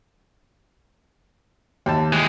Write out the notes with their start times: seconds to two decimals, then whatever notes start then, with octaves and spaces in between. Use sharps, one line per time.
1.86 D#2 A5
2.13 E3 G#3